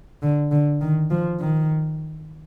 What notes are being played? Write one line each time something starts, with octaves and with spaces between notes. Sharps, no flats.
D3
D3
D#3
F3
D#3